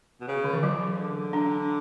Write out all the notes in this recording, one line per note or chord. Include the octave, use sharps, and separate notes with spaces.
B2
C#3
D3
E3
F#3
D3
D4